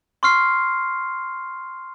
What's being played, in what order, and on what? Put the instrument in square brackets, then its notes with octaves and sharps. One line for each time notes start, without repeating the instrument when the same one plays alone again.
[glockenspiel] C6 C#6 F6 C7